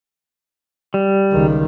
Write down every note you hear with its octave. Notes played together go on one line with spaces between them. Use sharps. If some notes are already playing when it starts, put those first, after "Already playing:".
G3
C#2 D#3